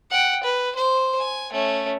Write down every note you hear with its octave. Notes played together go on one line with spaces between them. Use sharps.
F#5 G5
B4
C5
G#5
A3 C#4